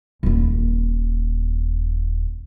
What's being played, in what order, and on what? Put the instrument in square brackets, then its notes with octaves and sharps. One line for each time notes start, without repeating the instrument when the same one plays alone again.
[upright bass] D#1 G#1